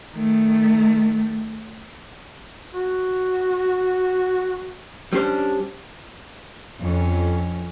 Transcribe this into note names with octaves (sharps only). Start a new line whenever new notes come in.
D#3 A3
F#4
G3 C#4 D4 C5
F2 C#4